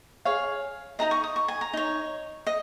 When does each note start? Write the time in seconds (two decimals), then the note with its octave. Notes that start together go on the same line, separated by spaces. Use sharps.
0.25 G#4 C#5 F5
0.99 D#4 G#4 D#5 A#5
1.11 C#6
1.24 D#6
1.36 C#6
1.48 G#5
1.61 A#5
1.73 D#4 C#5
2.47 D#5